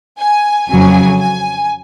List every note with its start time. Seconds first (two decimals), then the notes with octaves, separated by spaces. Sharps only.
0.18 G#5
0.68 F2 C#3 F#3 G#5
1.20 G#5